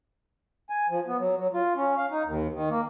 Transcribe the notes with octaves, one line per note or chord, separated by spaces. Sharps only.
G#5
F3
B3
F#3
F#3
F4
C#4
F5
D#4
D#2
D#3
A#3